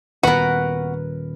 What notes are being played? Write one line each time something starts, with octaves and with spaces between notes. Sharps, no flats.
D#1 B3 F#4 A#4 B4